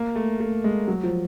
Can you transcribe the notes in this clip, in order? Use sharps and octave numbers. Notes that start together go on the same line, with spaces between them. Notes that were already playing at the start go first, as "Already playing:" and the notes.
Already playing: A#3
A3
A3
G#3
F#3
F3